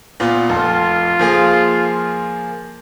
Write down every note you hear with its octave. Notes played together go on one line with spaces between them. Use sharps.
A#2 B3 F4
F1 F4 A4
F3 A#3 G#4